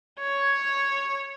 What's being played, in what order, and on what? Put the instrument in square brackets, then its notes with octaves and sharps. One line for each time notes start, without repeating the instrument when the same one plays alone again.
[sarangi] C#5